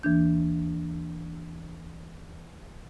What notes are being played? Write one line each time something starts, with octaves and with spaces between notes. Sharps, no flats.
D#2 E3 A#3 D4 G6